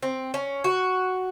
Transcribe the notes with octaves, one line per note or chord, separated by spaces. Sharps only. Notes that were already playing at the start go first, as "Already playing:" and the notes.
C4
C#4
F#4